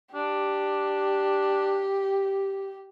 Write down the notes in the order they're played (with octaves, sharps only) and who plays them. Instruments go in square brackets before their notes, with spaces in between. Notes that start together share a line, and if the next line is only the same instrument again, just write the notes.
[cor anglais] D4 [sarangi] G4